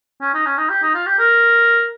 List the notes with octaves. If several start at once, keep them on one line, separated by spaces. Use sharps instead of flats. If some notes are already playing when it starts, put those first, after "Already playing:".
C#4
D#4
C#4
D#4
G4
D#4
F4
G4
A#4